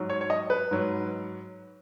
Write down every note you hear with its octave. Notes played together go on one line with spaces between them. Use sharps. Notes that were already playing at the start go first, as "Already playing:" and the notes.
Already playing: G#2 F#3
C#5
C#5
D#5
B4
G#2 F#3